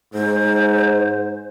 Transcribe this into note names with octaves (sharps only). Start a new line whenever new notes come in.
G#2 C5